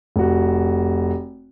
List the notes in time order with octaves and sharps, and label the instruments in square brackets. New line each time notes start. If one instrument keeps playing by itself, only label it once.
[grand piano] F1 F#4